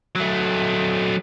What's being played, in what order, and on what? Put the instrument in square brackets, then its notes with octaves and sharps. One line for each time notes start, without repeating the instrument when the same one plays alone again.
[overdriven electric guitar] F#3 A3